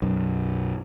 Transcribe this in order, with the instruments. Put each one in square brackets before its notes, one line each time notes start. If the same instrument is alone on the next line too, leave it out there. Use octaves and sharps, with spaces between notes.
[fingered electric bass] B1 F#2